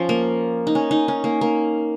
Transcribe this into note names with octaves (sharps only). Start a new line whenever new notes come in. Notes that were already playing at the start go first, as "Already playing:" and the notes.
Already playing: F3 C#4
A#3
D#4
C#4
D#4
C#4
A#3
A#3